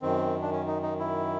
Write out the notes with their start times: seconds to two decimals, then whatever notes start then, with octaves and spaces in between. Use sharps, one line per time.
0.02 F#2 D#3 C4
0.42 D4
0.51 C#4
0.67 D#4
0.83 D#4
0.99 E4